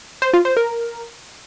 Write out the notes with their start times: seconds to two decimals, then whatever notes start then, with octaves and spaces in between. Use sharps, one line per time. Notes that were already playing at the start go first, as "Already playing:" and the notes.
0.22 C5
0.33 F4
0.45 C5
0.57 A#4